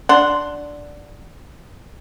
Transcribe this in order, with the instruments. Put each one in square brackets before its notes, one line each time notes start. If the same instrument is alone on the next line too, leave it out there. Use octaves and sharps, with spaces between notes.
[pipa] D4 F#5 C6